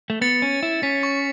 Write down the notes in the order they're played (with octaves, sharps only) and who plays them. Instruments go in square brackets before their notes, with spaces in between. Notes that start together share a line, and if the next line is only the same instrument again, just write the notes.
[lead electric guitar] A3
[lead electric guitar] B3 [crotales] A6 C#7
[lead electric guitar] C#4
E4
[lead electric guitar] C#4 [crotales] B6
[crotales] C#6